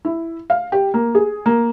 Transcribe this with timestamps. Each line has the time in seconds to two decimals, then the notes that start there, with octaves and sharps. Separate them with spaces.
0.05 E4
0.50 F5
0.72 G4
0.94 A#3
1.15 G#4
1.46 A#3